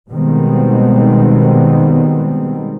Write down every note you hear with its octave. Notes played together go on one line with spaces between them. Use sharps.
B2 D#3 G3 G#3 B3 C4